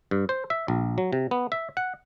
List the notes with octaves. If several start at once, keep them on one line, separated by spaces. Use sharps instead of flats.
G2
C5
E5
A#1
F#3
C3
B3
E5
F#5